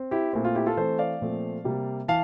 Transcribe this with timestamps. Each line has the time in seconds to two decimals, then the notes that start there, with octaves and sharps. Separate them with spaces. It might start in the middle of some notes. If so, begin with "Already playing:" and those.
Already playing: C4
0.11 E4 G4
0.33 A#2 A3 C4 E4
0.45 F4
0.55 E4 G4
0.66 F4 A4
0.77 E3 A3 C4 A4 C5
0.99 D5 F5
1.21 A#2 F3 A3 C4
1.64 C3 G3 A#3
2.08 E3 F5 A5